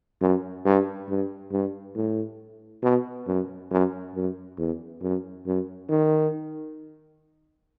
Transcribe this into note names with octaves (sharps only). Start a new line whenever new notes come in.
F#2
G2
G2
G2
A2
B2
F#2
F#2
F#2
E2
F#2
F#2
D#3